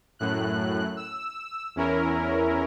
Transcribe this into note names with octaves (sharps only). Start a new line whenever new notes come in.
F#2 A2 F#6
E6
E2 C#4 E4 A#4